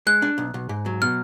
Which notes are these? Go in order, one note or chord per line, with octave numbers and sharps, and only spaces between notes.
G#3 F#6
D4
B1
B1
G#2
F#3
B2 F6